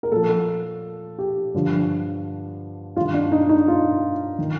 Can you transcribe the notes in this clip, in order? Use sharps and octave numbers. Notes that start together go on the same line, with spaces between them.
A#4
A#2 F3 A4
G4
G2 D3 F3
G2 D#3 F4
D4
D#4
D#4
F4
D#3